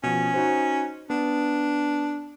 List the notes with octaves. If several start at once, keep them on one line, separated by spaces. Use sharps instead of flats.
B2 F3 C#4
D#4 F#4 C5
B3 D4